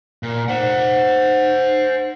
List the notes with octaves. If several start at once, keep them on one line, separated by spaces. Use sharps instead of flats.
A#2
C5 F#5